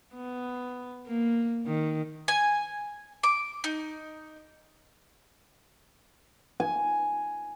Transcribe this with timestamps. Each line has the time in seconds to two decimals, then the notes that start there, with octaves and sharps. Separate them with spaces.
0.14 B3
1.07 A#3
1.66 D#3
2.28 G#5
3.23 D6
3.64 D#4
6.60 G#5